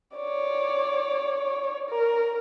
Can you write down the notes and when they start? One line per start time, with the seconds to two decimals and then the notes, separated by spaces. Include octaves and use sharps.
0.16 C#5 D5
1.89 A#4